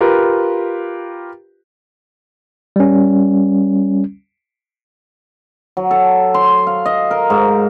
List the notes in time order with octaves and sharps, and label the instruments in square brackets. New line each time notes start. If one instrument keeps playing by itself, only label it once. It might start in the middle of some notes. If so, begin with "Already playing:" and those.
[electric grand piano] F4 G4 A#4 B4
[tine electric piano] G3 C#4
[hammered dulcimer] F#3
A4
C6
F5
D#5
A#4
G#2